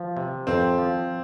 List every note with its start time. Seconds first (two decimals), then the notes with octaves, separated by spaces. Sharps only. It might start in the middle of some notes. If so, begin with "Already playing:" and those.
Already playing: F3
0.17 C3
0.47 F2 C4
0.78 F3